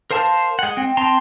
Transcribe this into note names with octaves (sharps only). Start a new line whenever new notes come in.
A#4 C5 F5 A5
G#3 F#5
C4
C4 A5 A#5 C6